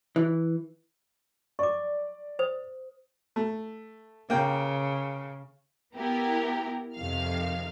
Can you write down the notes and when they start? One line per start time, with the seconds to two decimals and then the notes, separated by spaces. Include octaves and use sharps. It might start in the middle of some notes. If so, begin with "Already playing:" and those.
0.16 E3
1.59 D5 C#6 D6
2.39 C5 D#6
3.36 A3
4.30 C#3 A#3 G5
5.95 B3 E4 G4 A#4
6.96 F2 C3 D#3 F5 F6